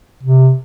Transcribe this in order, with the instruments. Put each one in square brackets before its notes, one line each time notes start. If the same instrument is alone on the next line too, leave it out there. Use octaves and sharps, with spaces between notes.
[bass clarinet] C3